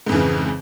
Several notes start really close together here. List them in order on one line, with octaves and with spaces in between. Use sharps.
G#2 F2 E3 C#3